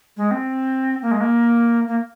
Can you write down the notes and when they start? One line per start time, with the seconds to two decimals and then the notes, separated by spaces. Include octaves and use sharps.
0.17 G#3
0.31 C4
1.01 A#3
1.11 G#3
1.20 A#3
1.87 A#3